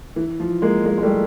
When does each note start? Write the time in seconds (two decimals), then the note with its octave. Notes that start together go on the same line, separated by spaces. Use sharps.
0.16 E3
0.40 F3
0.62 G#3 A#3
0.85 G#3 A#3
0.98 G#3
1.02 G3 A3